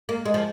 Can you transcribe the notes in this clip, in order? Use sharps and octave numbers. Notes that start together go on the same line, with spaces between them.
A#3
G#3
F3